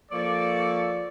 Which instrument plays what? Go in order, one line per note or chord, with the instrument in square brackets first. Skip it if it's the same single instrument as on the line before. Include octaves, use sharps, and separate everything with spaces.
[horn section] F3 D5 [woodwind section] A#3 A4 C#6